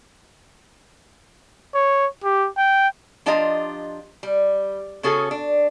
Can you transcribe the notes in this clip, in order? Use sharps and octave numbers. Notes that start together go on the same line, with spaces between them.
C#5
G4
G5
F3 D4 F4 G4 D#5 A#5
G3
C#3 C#4 F#4 G#4 A4
D4